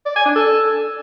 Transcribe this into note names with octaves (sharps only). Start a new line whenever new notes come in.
D5
G#5
D4
A4